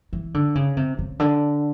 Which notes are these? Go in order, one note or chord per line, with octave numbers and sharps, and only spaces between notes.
E3
D3
C#3
C3
C#3
D3